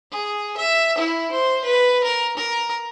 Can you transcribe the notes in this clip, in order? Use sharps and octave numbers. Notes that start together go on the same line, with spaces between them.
G#4
E5
E4
C5
B4
A#4
A#4